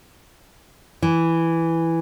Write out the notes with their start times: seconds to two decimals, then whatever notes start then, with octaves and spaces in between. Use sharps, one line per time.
1.02 E3